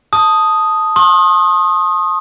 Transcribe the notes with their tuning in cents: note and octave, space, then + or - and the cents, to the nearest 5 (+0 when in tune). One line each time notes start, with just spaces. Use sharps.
A5 +0 D#6 +0
C6 +40 D#6 +0